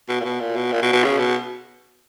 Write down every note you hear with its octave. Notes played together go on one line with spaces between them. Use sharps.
B2
A#2
B2
A#2
B2
A#2
B2
B2
C#3
B2